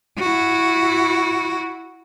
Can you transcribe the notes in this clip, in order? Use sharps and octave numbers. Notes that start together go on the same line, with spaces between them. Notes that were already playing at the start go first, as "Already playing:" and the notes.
E4 F#4